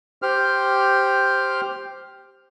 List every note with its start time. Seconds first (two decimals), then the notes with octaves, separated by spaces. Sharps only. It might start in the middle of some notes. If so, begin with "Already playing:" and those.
0.22 G4 C5 F6